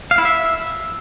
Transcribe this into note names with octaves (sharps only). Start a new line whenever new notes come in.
F5
E4
E5